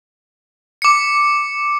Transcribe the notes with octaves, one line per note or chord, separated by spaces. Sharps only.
D6 C#7